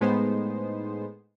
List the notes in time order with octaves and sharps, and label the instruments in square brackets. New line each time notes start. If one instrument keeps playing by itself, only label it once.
[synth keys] A2 G#3 B3 D#4 C5